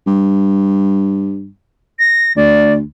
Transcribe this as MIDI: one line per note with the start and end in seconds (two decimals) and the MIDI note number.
0.07 1.48 43
1.99 2.32 94
2.36 2.81 38
2.36 2.73 74